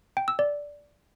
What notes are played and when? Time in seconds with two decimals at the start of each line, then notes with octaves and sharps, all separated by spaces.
0.17 G5
0.28 E6
0.39 D5